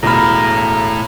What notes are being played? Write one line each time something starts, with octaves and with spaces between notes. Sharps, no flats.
E1 A2 A#5 B5 F6 A#6